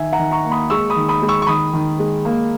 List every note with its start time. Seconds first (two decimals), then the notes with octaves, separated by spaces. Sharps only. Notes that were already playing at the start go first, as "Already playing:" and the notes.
Already playing: D#3 E5 G#5
0.13 F#5 A#5
0.19 D#3
0.31 A#5 C#6
0.45 A#3
0.51 B5 D#6
0.70 G#3 C#6 E6
0.90 B5 D#6
0.96 D#3
1.09 B5 D#6
1.22 G#3
1.28 C#6 E6
1.42 C#6
1.47 D#3 B5 D#6
1.73 D#3
1.99 G#3
2.25 A#3